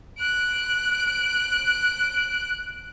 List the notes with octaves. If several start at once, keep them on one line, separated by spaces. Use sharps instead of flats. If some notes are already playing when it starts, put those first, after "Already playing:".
F#6 D7